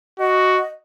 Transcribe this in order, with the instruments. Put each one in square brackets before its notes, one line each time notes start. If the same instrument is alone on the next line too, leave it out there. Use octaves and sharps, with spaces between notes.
[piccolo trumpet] F#4 [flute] D#5